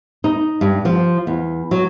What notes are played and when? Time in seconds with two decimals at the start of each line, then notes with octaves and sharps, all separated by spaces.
0.24 D#4
0.61 G2
0.85 F3
1.27 E2
1.71 F#3